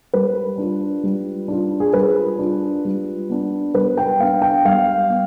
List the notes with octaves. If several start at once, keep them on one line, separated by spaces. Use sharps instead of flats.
G3 B4
D4 F4
G3
D4 F4
G#4
G3 B4
D4 F4
G3
B3 D4
G3 B4
G5
B3 D4 F5
G5
G3 F5
B3